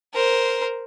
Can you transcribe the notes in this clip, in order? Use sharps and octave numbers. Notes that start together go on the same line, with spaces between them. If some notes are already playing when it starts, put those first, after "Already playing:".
A#4 C5